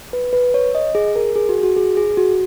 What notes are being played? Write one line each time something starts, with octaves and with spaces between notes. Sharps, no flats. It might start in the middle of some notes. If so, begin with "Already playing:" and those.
B4
B4
C#5
D#5
G#4
A#4
G#4
F#4
F#4
G#4
G#4
F#4